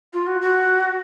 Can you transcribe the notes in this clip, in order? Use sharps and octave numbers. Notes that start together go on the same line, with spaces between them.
F4
F#4
F#4